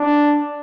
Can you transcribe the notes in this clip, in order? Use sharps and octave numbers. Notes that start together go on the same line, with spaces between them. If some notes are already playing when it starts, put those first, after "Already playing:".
Already playing: D4